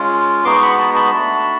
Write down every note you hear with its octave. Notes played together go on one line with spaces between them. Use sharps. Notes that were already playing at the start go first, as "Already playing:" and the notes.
Already playing: G#3 C#4 F4
G#3 B3 D#4 F#4 C6 D6
B5 C#6
A5 B5
A5 B5
A3 D4 F#4